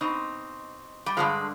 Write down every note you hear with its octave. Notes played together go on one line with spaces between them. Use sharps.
B2 C4 D#4
G3
G2 D3 F3 G#3